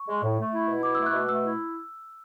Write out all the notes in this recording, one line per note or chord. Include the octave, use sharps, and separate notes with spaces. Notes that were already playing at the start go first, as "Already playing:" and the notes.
Already playing: C#6
G#3
A2
A3
E4
B2
E4 D6
E6
A3
F#6
B2 E6
A3 E6
E4